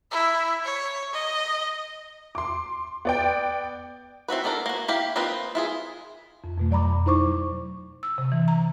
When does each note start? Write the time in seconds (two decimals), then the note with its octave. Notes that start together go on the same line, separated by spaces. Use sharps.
0.11 E4
0.65 C#5
1.13 D#5
2.35 C6 D6
3.05 B3 D5 G5
4.28 C4 E4 F#4 B4
4.44 B3 D4 A4 A#4
4.66 A#3 F#4
4.88 E4 G4 F5
5.16 A#3 C4 D#4 F4 B4
5.55 E4 F4 G#4
6.44 F2
6.58 F2 B2 A3
6.71 F#3 D5 A#5 B5 D6
6.85 F2
7.06 D#4 E4 C5 C#6 D6
7.23 F#3
8.03 E6
8.18 C3
8.32 E3
8.48 A#5